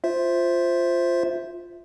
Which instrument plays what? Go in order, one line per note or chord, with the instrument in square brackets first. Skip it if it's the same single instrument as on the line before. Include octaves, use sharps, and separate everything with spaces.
[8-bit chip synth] F4 C5 E5